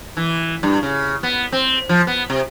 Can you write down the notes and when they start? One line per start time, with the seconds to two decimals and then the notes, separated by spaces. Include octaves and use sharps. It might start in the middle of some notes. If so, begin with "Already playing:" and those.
0.17 E3
0.63 G2
0.83 C#3
1.23 B3
1.52 C4
1.89 F3
2.07 B3
2.30 C3